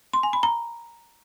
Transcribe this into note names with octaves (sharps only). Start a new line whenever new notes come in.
C6
G#5
B5
A#5